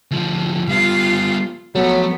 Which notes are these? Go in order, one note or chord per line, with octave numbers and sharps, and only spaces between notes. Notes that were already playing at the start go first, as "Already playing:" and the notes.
D2 F3
G3 B3 F4 F5
F3 F#3 A3 B3